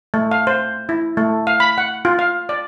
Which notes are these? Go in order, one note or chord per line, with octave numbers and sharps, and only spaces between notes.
A3
F5
C5
E4
A3
F5
B5
F#5
F4
F5
D5